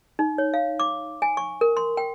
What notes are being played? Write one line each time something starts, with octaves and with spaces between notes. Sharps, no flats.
D#4
C#5
F5
D6
G#5
C#6
A#4
C6
G5